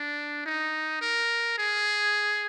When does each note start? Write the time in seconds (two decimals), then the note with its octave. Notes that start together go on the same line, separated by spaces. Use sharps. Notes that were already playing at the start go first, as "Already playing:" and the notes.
Already playing: D4
0.46 D#4
1.01 A#4
1.58 G#4